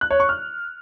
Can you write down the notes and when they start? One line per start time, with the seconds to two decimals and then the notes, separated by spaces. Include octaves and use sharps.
0.01 F#6
0.10 C#5
0.20 C#6
0.29 F6